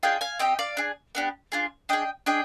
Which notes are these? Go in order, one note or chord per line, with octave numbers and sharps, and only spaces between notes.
D4 F4 G#4 D#5 G5
F5 G#5
C4 G4 D#5 G5
D5 F5
D4 G#4
B3 D4 G4
D4 F4 G#4
D4 G#4 D#5 G5
D4 G#4 D#5 G5